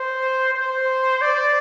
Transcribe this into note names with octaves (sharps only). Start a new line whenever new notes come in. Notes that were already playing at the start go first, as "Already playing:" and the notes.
Already playing: C5
C5
D5